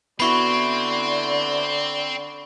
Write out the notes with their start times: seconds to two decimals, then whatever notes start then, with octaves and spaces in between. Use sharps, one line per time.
0.20 D3 B3 C4 E4 F#4 B5 C#6